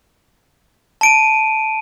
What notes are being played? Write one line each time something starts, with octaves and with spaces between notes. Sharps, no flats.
A5 D7 D#7